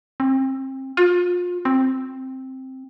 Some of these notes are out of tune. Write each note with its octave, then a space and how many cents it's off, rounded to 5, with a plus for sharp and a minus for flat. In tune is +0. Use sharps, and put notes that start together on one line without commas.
C4 +30
F4 +30
C4 +5